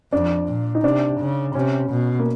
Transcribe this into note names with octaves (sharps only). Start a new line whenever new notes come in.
F2 D4
A#2
D#4
C3 D4
C#3
C3 C#4
B2
A#3